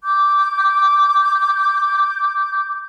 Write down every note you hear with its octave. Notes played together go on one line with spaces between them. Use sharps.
D6 G6